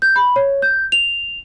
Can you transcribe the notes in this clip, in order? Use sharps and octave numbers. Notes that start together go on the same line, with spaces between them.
G6
B5
C#5
G6
F7